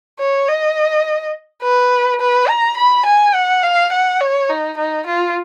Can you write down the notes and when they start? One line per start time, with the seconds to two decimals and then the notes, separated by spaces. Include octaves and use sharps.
0.19 C#5
0.48 D#5
1.63 B4
2.21 B4
2.48 A#5
2.77 B5
3.06 G#5
3.34 F#5
3.63 F5
3.92 F#5
4.21 C#5
4.49 D#4
4.77 D#4
5.07 F4